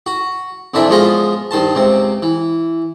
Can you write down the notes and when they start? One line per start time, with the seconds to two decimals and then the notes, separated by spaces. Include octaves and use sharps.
0.06 F#4
0.74 F2 A#2 E3 D4 E4 B5
0.90 F3 G#3 B3 C#4 F4 D#5
1.51 G2 D#3 C5 A5
1.75 C#2 C3 C4
2.22 E3